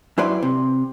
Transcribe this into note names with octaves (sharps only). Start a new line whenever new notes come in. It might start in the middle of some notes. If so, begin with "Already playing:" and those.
F#2 E4 B4 C5 D5
C3